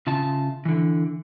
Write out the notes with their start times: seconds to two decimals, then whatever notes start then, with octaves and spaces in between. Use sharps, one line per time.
0.07 C#3 F4 E5 A5
0.65 D3 E3